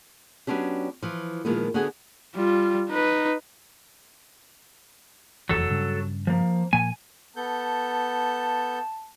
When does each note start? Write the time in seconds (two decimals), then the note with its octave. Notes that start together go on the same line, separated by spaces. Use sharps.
0.47 F#3 A3 B3 C#4 D4 G4
1.02 E3 F3
1.45 A#2 D#3 F3 G#3 A#3 B3
1.74 D3 B3 F#4 G#4 F#5 G#5
2.35 G3 F4
2.90 D#4 B4
5.49 F1 E2 F#3 A4
5.70 G2 C#3
6.27 F3 A#3
6.73 A#2 F3 A#3 G#5
7.36 B3 A4 A5 G6